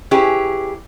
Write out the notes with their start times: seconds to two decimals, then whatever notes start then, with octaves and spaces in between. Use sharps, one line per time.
0.11 C#4 E4 G4 G#4 B4